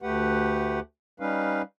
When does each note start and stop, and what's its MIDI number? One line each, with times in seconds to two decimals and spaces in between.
0.02 0.80 38
0.02 0.80 57
0.02 0.80 67
0.02 0.80 71
0.02 0.80 78
1.20 1.62 55
1.20 1.62 61
1.20 1.62 63
1.20 1.62 71
1.20 1.62 77